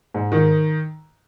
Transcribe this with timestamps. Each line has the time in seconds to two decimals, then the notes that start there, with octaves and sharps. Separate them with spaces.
0.14 G#2
0.32 D#3